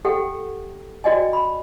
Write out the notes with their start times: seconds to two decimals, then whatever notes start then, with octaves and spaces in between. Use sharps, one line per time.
0.05 G4 A4 F#5 G5
1.04 F#4 D5 D#5 G5 G#5
1.33 B5